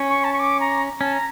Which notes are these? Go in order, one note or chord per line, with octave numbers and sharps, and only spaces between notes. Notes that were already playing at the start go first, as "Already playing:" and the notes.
Already playing: C#4
C#6
A5
C#6
D6
A#5
C#4 A5
A#5